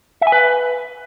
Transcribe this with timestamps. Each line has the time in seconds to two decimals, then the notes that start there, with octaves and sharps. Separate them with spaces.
0.21 E5
0.27 G#5
0.32 B4